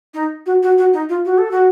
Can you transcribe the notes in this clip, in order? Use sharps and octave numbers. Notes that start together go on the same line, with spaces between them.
D#4
F#4
F#4
F#4
D#4
F4
F#4
A4
F#4